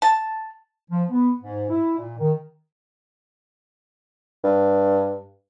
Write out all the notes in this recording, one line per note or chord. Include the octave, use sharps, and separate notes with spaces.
A5
F3
B3
G#2
E4
A#2
D#3
G2